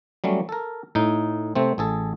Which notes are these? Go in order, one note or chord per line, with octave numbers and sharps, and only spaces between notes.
F#3 G3 A3 C#4
A4 A#4
A2 D#4
C3 A3 C4
A1 G#4 A4